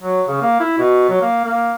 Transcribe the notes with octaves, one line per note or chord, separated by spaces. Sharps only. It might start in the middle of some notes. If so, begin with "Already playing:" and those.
F#3
C#3
A#3
E4
B2
F#3
A#3
A#3